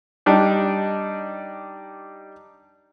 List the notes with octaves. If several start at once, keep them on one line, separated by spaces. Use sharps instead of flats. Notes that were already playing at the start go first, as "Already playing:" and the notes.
G3 D4 D#4